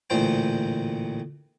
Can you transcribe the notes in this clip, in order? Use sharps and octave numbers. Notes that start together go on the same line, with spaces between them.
A1 D2 A#2 C5 G5